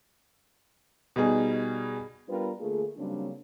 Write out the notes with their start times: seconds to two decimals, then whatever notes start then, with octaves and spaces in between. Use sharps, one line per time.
1.16 B2 G3 D#4 G#4
2.29 G3 B3 D4 F4 A#4 B4
2.60 D3 A3 A#3 F4 G#4
2.97 C#3 F#3 G3 A#3 C4 D4